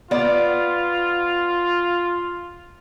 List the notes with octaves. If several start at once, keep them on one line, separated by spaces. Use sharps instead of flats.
B3 F4 D5